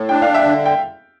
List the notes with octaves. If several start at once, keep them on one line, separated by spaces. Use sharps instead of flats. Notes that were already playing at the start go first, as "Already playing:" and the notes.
Already playing: A2 A4
D4 G5
F5
E5 G5
D3
G5